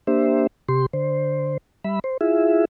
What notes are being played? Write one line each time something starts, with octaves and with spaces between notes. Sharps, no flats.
A#3 D4 G4 C5 E5
C3 G4 C6
D3 C5
G3 E5 B5
C5
E4 F4 G#4 E5